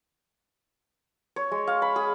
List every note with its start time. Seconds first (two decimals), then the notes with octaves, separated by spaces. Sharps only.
1.36 C#5
1.52 G#3
1.67 F5
1.82 B5
1.96 G#4